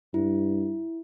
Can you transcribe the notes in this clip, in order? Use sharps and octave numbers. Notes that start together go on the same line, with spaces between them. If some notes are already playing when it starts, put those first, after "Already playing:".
G2 E4